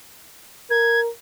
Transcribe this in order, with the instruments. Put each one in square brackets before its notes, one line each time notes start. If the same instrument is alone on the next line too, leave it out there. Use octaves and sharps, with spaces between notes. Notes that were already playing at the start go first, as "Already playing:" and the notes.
[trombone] A#4 [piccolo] G#6